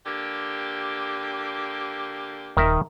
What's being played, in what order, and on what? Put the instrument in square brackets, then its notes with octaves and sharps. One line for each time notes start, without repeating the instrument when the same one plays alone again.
[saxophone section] D3 A#3 G4
[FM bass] D#1 [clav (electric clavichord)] D#3 A#4 E5